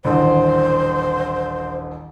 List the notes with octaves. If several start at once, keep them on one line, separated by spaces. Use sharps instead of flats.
D#1 A1 D3 C5